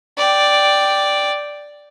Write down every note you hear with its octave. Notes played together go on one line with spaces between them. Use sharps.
D5 G5